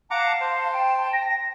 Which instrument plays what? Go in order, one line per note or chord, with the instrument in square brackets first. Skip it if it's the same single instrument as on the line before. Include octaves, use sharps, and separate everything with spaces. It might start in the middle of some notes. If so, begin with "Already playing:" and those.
[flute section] F5 A5 [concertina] F#5 A#5 D6
[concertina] C5
[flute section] G5 A5
[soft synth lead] A#6